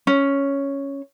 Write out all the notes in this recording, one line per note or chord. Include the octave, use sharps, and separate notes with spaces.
C#4